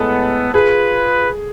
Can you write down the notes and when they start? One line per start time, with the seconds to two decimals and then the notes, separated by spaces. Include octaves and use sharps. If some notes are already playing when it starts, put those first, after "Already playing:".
Already playing: A2 G#3 B3 A4
0.53 F4 G#4 B4